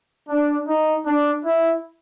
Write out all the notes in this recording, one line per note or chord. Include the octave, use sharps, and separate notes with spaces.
D4
D#4
D4
E4